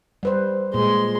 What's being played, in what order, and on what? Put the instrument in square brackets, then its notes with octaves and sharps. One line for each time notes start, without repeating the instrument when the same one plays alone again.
[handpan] G3 B4 C5
[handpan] A#2 [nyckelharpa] G#3 C6